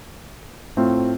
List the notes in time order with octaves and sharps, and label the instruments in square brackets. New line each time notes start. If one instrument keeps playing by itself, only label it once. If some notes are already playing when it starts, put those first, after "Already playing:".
[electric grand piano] A2 A3 C4 F4